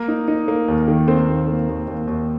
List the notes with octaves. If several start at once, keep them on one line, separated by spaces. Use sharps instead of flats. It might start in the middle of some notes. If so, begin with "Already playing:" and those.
Already playing: A#3 A#4
D#4
D#4
A#3
D#2
D#3
D#3 C4 C5
D#2
A#3
D#2
D#2
D#2